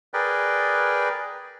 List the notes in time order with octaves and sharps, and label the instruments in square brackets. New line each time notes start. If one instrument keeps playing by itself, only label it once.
[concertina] G#4 A#4 B4 D5 G5